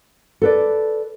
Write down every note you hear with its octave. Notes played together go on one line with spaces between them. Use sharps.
A4 B4 D5